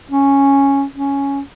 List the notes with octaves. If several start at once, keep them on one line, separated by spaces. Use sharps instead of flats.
C#4
C#4